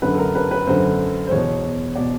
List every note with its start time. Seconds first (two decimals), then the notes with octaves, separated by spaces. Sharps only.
0.02 F#2 D3 B4
0.15 A4
0.18 A#4
0.35 B4
0.51 B4
0.67 F#2 D3 C5
1.27 C5
1.31 E2 B2 C#5
1.96 B2 D5